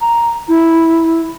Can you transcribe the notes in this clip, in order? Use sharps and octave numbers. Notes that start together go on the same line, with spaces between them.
A#5
E4